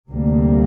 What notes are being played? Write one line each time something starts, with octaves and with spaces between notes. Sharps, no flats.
D2 C3 G3 A#3